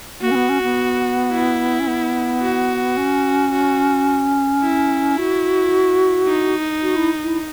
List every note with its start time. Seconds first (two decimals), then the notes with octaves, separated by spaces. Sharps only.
0.22 A#3 F#4
0.31 C#4
0.35 B3
0.49 C#4
0.63 B3
1.32 E4
1.80 C#4
1.87 B3
2.42 F#4
2.97 C#4
3.52 F#4
4.62 E4
5.18 F#4
6.28 D#4
6.82 F#4
6.96 E4
7.24 E4